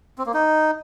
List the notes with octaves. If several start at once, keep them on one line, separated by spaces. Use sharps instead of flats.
C4
A#3
D#4